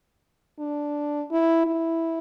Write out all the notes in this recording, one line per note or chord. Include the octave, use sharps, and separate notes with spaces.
D4
E4
E4